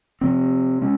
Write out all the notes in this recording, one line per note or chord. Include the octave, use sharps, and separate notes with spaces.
C3 F3 C4
G#3 C#4